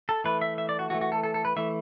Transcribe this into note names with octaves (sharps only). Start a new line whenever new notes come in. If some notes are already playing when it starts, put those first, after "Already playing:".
A4
E3 A3 B4
E5
E5
D5
F#4
E3 A3 F#4
F#4
A4
A4
A4
B4
E3 A3 E5